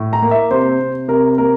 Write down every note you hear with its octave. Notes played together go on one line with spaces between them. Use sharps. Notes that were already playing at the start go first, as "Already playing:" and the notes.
Already playing: A2
A#5
A#3
E5
C3 C5
C3
C3 A#4
A#3 A#4